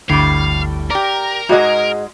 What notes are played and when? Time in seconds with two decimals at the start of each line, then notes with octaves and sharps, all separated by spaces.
0.09 G1 D2 A2 D3 G3 F5
0.90 G4 A#4 D5 A#5
1.49 G#2 G#3 F#4 G#4 D#5